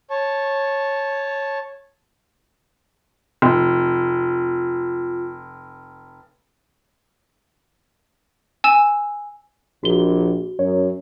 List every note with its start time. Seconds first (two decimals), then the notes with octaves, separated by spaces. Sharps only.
0.10 C#5 A5
3.42 F1 F4
8.64 G#5 E6 E7
9.84 A#1 F#4 G7
10.59 F#2 C#5